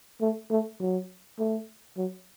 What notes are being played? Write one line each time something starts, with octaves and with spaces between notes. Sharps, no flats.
A3
A3
F#3
A3
F#3